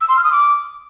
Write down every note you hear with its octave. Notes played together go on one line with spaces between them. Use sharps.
E6
C6
F6
D#6
D6